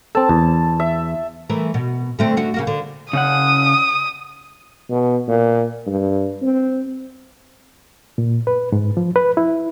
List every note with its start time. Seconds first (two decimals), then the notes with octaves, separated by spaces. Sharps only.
0.15 C4 A4 A5
0.29 E2
0.80 E5
1.50 E3 A3 A#4
1.74 B2
2.19 D3 A3 C4
2.37 D3 F#4
2.54 C#3 A#3 F#4
2.67 D3
3.13 C#3 C#4 F#5 D#6
4.90 B2
5.28 A#2
5.86 G2
6.42 C4
8.18 A#2
8.47 B4
8.72 G#2
8.97 F3
9.16 B4
9.37 E4